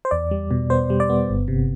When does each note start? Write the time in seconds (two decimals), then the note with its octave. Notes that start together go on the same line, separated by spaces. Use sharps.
0.05 C5
0.11 E2 D5
0.31 G3
0.51 B2
0.70 B3 C5
0.90 G3
1.00 D5
1.09 B3
1.29 G1
1.48 C3